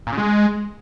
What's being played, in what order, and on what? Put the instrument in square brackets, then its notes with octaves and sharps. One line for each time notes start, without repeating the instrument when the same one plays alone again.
[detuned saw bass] A#2
C#3
G#3